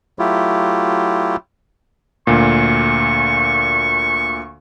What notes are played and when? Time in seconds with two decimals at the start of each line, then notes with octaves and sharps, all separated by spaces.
0.19 F#3 A3 E4 F4 G4
2.27 D2 A#2 C#6